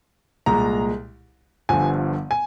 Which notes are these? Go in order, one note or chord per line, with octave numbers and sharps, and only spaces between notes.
C2 A#2 G#3 A#5
G1 G2 D3 F3 G#5
G#5